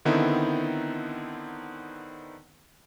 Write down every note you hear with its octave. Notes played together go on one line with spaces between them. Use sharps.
D3 D#3 B3 C4 D#4 E4